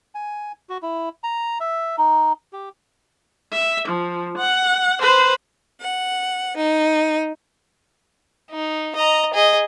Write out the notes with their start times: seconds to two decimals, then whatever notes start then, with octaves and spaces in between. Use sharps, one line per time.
0.15 G#5
0.69 F#4
0.82 E4
1.24 A#5
1.60 E5
1.98 D#4
2.53 G4
3.53 E5
3.88 F3
4.38 F#5
5.01 B4 C5
5.81 F#5
6.56 D#4
8.51 D#4
8.95 D#5 A#5
9.34 G#4 D#5